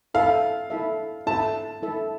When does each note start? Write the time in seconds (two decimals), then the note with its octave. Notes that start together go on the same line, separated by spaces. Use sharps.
0.14 E4 A4 E5 F5
0.70 E4 A4 E5
1.27 E4 A4 E5 A5
1.82 E4 A4 E5